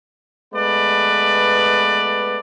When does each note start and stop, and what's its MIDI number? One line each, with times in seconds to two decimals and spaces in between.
0.54 2.39 56
0.54 2.39 57
0.54 2.39 59
0.54 2.39 71
0.54 2.39 74